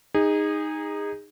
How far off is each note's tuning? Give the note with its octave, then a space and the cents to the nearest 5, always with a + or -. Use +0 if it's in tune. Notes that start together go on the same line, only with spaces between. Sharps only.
D#4 +0 G#4 -25